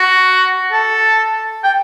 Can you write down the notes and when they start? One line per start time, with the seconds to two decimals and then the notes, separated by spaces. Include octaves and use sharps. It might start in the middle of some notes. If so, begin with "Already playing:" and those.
Already playing: F#4
0.72 A4
1.63 G5